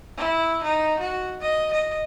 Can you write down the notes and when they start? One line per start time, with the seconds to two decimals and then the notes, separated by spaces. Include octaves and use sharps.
0.18 E4
0.64 D#4
1.00 F#4
1.41 D#5
1.73 D#5